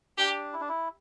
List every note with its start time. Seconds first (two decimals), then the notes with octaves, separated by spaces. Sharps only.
0.18 D4 G4
0.53 E4
0.60 D4
0.69 E4